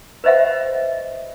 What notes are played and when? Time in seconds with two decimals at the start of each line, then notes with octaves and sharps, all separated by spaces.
0.24 B4 C5 D#5 E5 F#5